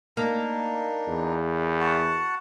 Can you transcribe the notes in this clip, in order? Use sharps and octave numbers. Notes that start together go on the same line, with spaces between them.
A#3 D4 D#4
E2
F#4 F#5 A5